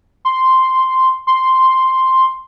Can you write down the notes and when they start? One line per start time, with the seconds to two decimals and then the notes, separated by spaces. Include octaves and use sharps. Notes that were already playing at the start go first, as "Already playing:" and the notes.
0.25 C6
1.27 C6